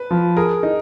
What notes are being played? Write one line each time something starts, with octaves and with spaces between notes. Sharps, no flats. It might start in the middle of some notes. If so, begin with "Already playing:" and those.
Already playing: B4
F3
G#4 A#4
D#4